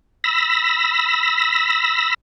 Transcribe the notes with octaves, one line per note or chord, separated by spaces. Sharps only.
B5 E6 A#6